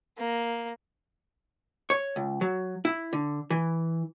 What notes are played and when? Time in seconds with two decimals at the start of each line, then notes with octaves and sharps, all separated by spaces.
0.18 A#3
1.90 C#5
2.16 C#2
2.41 F#3
2.85 E4
3.13 D3
3.50 E3